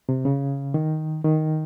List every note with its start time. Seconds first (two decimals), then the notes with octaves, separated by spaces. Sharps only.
0.09 C3
0.25 C#3
0.74 D#3
1.24 D#3